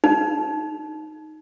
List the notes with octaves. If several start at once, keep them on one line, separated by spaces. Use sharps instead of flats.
D#4